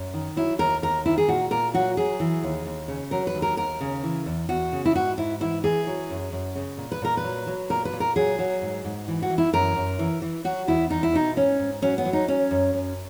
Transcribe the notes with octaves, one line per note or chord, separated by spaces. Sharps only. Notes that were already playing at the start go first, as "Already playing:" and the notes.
Already playing: F#2
D#3
F#3 E4
D#2 A#4
D#2 A#4
D#3 E4
G#4
A#2 F#4
A#2 A#4
F#3 F#4
F#3 G#4
E3
D#2
D#2
C#3
F#3 A#4
B4
D#2
A#4
D#2 A#4
C#3
E3
E2
E2 F#4
C#3
E4
G#2 F#4
G#2 E4
E3 E4
E3 G#4
F#3
F#2
F#2
C#3
A#2
B4
A#2 A#4
B4
F#3
F#3
A#2 A#4
B4
A#2
A#4
F#3 G#4
F#3
G#2
G#2
E3
F#4
E3
E4
F#2 A#4
F#2
E3
E3
F#3 F#4
E2 E4
E2 D#4
E4
B2 D#4
G#2 C#4
G#2
F#3 C#4
B3
F#3
D#4
F#3 C#4
F#2
F#2